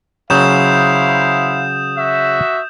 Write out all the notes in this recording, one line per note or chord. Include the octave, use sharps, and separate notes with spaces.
C#3 F#3 E4 C5 F5 D#6 G6 E7
F#4 E5